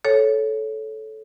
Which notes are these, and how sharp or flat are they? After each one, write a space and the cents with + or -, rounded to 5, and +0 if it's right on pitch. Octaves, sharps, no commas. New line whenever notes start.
A4 -15 C#5 +0